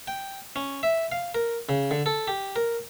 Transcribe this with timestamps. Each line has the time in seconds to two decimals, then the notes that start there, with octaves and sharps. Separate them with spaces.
0.07 G5
0.56 C#4
0.83 E5
1.12 F5
1.34 A#4
1.69 C#3
1.91 D3
2.06 A4
2.28 G4
2.56 A#4